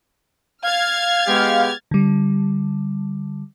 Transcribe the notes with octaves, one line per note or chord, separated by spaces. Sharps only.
F5 F6 G#6 A6
G#3 B3 G4
D3 G3